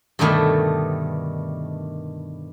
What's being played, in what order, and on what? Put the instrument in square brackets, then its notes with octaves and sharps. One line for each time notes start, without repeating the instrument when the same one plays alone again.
[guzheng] G2 B2 D3 D#3 A3